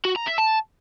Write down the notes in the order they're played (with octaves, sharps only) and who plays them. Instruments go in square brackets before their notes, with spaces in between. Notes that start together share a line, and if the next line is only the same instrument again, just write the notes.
[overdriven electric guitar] F#4
A#5
E5
A5